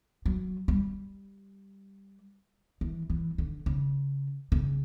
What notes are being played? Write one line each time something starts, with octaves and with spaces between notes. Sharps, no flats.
F#3
G3
E3
E3
D3
C#3
C#3